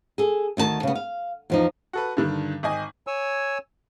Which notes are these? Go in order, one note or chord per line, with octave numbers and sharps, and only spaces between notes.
G#4 A4
D2 D#3 B4 A5
C#3 B3
F5
E2 F3 D#4
F#4 A4 B4
G2 D3 D#3
G#1 D#5 G#5
C#5 G#5 E6